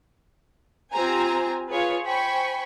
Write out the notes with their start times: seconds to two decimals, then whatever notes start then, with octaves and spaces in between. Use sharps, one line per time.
0.92 C4 F4 G4 C5 G#5 A#5
1.68 F4 G#4 B4 C#5 F5
2.04 C5 G5 G#5 B5 C#6